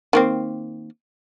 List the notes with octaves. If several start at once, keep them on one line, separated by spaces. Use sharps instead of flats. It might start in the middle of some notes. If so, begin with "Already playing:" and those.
D#3 A#3 C4